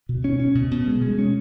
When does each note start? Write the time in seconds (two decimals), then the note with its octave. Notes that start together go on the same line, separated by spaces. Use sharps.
0.09 B2
0.24 C#4
0.40 C#4
0.55 B2
0.71 B2
0.87 G#3
1.02 G#3
1.19 C#4